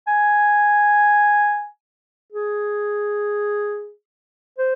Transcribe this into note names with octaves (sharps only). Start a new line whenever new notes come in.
G#5
G#4
C5